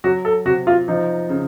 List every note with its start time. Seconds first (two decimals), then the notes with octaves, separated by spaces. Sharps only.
0.04 F#3 F#4
0.25 A4
0.45 C3 F#4
0.67 F4
0.88 F3 D#4
1.29 C#3